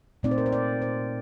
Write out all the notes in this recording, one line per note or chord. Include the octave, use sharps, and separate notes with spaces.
A#2 A3 C4 D#4 D5
C5
A#4
C5
D5
C5